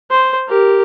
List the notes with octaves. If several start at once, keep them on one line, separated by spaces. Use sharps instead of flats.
C5
G4 A#4